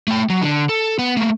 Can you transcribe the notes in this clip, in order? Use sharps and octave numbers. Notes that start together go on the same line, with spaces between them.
A3 G5
F#3
D3
A4
B3
A3 A#3